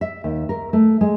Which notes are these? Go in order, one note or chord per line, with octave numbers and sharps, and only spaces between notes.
E5
D#2
A#4
A3
G#3